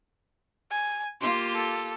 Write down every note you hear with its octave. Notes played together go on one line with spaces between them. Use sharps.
G#5
A#3 F4 G4 C6
A4